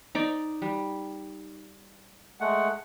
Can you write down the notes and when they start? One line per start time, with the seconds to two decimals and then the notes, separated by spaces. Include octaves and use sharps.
0.15 D#4 D5
0.62 G3
2.40 G#3 A3 F#5